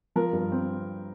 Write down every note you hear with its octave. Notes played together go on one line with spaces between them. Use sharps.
F3 A#4
G2
C4